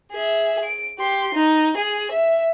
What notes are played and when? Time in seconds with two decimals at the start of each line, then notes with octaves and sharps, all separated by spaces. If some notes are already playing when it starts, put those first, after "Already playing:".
0.12 G#4 E5
0.65 D7
0.99 G4 C6
1.35 D#4
1.77 G#4
2.12 E5